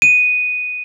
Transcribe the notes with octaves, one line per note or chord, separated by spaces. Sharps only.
D#7